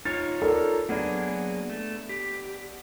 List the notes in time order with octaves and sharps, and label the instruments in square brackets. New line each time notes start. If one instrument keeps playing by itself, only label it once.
[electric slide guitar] D#4 F4 C#5 [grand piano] A6
[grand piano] A4 A#4 D5
[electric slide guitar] F#3 A#3 G#4 [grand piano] B3 D4
[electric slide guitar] A3
G4